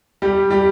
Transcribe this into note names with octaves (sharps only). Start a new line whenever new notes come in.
G3 G4
G3 G4